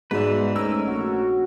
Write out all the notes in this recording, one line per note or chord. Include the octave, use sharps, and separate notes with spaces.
G#2 B2 G#3 B4 D5 E5
G#2 A3 C#4 A#4 E6
A#1 F#4